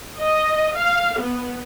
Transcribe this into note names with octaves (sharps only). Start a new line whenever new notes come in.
D#5
F5
B3